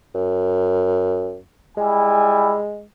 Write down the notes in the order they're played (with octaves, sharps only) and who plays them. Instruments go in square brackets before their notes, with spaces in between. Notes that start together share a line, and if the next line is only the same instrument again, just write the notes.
[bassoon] F#2
[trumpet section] G3 E4 G#5 [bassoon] G#3